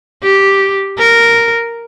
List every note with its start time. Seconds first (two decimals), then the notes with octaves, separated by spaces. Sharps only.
0.23 G4
0.98 A#4